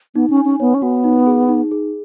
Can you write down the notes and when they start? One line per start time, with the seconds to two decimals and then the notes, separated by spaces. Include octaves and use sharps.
0.15 B3 D#4
0.30 C#4
0.37 G#5
0.45 C#4
0.60 B3 C#5
0.74 C#4
0.82 B3 F#4
1.04 D#4
1.27 G#4
1.49 D#4
1.71 G#4